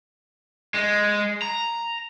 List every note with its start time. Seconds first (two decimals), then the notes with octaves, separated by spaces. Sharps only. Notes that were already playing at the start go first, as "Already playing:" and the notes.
0.74 G#3
1.42 A#5